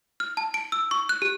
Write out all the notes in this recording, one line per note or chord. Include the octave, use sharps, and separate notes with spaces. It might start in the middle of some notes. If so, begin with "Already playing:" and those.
F6
A5
D7
E6
C#6
F#6
G4